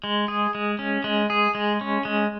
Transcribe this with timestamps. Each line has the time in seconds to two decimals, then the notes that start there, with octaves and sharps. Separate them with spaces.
0.04 G#3
0.28 G#4
0.55 G#3
0.79 C#4
1.04 G#3
1.30 G#4
1.55 G#3
1.81 C#4
2.05 G#3